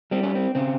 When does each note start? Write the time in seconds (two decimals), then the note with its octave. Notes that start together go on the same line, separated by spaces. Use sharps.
0.11 G3 C4
0.23 C#4
0.35 C4
0.55 C#3 C4